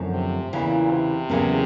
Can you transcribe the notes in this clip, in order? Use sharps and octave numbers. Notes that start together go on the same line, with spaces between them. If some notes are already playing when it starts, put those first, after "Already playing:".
Already playing: F#2 D3 F3 A3 C4
C3
E2 A#2 C#3 E3
C3
E2 C#3 F#3 A#3 C#4